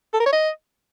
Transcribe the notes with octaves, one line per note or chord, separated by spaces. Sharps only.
A4
A#4
C#5
D#5